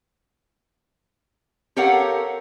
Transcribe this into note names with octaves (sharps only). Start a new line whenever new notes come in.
G4 A4 A#4 C#5 F5 F#5